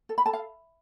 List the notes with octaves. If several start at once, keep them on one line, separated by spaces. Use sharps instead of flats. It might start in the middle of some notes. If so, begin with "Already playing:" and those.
A4
B5
A4 A5
F5